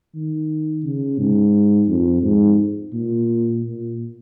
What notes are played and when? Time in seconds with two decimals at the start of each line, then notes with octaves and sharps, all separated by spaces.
0.15 D#3
0.84 C#3
1.18 G#2
1.88 F2
2.23 G#2
2.93 A#2
3.63 A#2